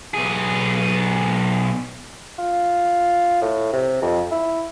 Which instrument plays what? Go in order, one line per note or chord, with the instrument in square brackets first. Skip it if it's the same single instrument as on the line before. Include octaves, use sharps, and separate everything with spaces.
[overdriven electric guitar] B1 G#4
[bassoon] F4
A2
C3
F2
E4